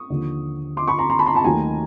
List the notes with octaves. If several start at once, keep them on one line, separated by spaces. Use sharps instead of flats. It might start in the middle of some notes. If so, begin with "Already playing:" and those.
Already playing: C#6 D#6
D#2 D3 F3
C6 D6
B5 C#6
A#5 C6
A#5 C6
A5 B5
A#5 C6
A5 B5
D#2 D#3 F#3 A3 G#5 A#5